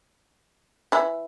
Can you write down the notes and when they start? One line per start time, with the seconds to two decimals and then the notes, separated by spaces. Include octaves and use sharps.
0.92 E3 E4